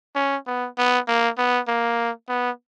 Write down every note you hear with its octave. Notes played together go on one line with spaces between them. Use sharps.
C#4
B3
B3
A#3
B3
A#3
B3